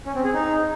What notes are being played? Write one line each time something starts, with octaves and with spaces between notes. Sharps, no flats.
C#4
C4
G#4
D#4